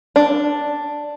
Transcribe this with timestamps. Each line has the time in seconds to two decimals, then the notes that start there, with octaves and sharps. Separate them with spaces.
0.16 D4